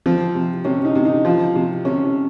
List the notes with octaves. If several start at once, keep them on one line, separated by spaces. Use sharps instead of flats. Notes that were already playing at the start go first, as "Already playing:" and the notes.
F3 C4
C3
C3 C#4
D#4
C3
D#4
F3 F4
C3
C3 C#4